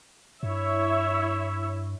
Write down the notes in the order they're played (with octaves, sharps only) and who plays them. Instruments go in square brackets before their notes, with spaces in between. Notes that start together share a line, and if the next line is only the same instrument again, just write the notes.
[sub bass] G2 [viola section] E4 C#5 E5